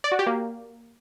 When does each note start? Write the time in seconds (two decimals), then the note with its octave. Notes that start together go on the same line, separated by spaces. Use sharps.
0.04 D5
0.12 F#4
0.19 G4
0.26 A#3